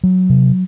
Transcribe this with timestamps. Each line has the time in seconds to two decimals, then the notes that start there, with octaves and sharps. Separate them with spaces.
0.03 F#3
0.30 C3